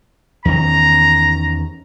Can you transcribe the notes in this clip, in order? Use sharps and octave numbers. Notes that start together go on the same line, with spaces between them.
E2 D#3 C#4 A#5